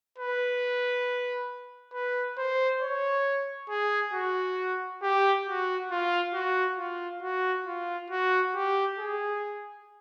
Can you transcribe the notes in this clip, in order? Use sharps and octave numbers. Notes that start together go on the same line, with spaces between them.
B4
B4
C5
C#5
G#4
F#4
G4
F#4
F4
F#4
F4
F#4
F4
F#4
G4
G#4